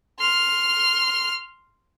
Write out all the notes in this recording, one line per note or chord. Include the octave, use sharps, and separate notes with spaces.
C6 F6